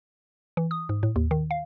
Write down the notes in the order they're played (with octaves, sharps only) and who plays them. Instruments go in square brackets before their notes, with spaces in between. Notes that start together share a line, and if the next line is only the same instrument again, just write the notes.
[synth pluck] E3
D#6
G#2
A2
D#2
D#3
F5